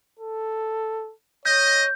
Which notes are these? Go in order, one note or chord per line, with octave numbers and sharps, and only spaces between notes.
A4
C#5 D#5 G6